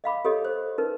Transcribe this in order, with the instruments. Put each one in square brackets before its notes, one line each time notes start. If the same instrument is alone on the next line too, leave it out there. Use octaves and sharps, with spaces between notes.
[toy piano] D#5 F5 B5 D6
G4 A4 C#5 D#5
C5
D#4 A#4 B4